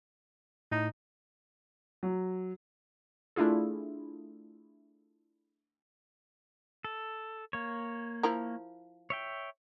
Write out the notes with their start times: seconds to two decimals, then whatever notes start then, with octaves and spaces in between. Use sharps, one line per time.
0.72 A2 D#4
2.03 F#3
3.36 A3 D4 E4 F4 G#4
6.84 A4
7.53 A#3 C#5
8.23 F3 E4 A#4
9.10 C#5 E5 G5